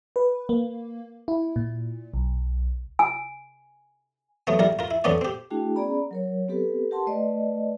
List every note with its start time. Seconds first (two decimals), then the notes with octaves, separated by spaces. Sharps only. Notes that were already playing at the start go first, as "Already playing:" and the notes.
0.16 B4
0.49 A#3
1.28 E4
1.56 A#2
2.14 B1
2.99 G#5
4.47 F#3 A3 B3
4.59 A#1 G3 E4 A#4
4.79 F4 A#4
4.91 E4
5.04 A#1 F2 D3 B3 C#4 D5
5.21 C4 G4
5.50 A3 D4 E4 F#4 G#4 G5
5.76 B3 C#4 G#4 D5 A#5 B5
6.11 F#3 A#4 C#5
6.48 B3 C4 G4 A4 B4
6.91 G4 A#4 F#5 A5 C6
7.07 A3 B4 D5 D#5